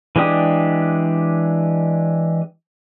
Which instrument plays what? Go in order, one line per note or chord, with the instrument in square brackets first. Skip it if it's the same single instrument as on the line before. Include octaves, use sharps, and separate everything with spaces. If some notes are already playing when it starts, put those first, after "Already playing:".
[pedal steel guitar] E3 G#3 D4 G4 D#6